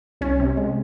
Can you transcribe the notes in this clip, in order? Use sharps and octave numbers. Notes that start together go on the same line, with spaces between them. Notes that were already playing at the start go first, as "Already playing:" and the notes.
C2 C#4
C3
G#3